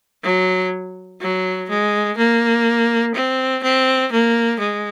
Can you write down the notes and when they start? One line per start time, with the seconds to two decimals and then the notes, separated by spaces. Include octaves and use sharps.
0.24 F#3
1.21 F#3
1.69 G#3
2.17 A#3
3.15 C4
3.63 C4
4.12 A#3
4.60 G#3